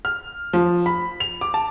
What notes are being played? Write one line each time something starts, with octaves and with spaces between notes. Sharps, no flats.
F6
F3
B5
F7
D6
A5